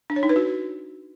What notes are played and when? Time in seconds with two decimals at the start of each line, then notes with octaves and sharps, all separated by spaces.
0.10 D4
0.16 C#5
0.23 D#4
0.29 B4
0.36 F#4